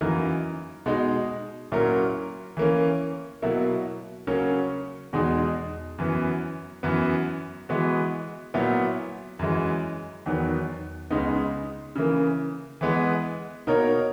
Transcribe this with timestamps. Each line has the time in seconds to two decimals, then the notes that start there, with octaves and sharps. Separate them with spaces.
0.01 F#2 E3 A#3 D#4 A#4
0.86 B2 G#3 D#4
1.72 A#2 F#3 C#4 E4 A#4
2.57 E3 A#3 C#4
3.42 B2 F#3 A#3 E4
4.27 C#3 F#3 A#3 C#4
5.13 E2 B2 G#3 D#4
5.98 F#2 E3 B3
6.83 F#2 E3 B3
7.69 E3 G#3 B3 F#4
8.54 A#2 F#3 B3 E4
9.39 F#2 E3 G#3
10.26 E2 D#3 F#3 B3
11.10 C#2 C#3 G#3 B3 D#4
11.95 C#3 E3 A#3
12.81 E3 G#3 B3
13.67 B2 A#3 D#4 A#4 C#5